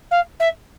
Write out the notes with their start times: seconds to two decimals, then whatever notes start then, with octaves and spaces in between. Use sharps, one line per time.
0.11 F5
0.40 E5